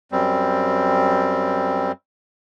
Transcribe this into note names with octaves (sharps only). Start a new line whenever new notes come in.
F#2 G3 C4